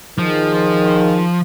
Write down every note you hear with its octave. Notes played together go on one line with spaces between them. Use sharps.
D#3 F3 G#4